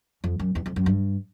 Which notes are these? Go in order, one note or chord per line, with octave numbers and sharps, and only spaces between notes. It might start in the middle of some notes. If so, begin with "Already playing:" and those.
F2
F#2
E2
F2
F#2
G2